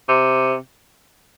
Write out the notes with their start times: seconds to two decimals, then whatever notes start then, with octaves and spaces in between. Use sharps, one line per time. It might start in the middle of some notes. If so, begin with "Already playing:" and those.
0.09 C3